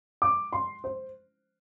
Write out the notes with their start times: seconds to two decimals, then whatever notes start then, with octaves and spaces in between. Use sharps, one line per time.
0.22 D6
0.53 C6
0.84 C5